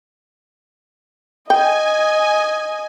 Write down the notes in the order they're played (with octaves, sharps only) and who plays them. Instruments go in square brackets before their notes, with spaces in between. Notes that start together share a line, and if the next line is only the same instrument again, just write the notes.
[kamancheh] D#5 [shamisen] G5 [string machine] G#5